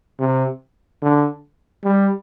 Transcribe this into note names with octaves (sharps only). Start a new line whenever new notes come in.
C3
D3
G3